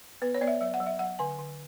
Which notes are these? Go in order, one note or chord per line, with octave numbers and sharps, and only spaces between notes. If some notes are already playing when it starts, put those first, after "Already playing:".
B3 B4
C#5
B3 D5
E5
F#3 E5
F#5
F#3
E5
F#3 F#5
D3 G#5
D3